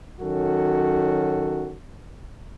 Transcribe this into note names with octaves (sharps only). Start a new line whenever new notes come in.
D#3 F#3 C#4 F#4 A4